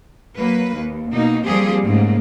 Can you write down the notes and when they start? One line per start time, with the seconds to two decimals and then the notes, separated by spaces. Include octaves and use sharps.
0.35 F#3 A#3 B4
0.76 D#2
1.12 B2 A#3 D#4
1.44 F3 G3 A#3 C4 G4 G#4
1.83 G#2 C#3 A3 A#3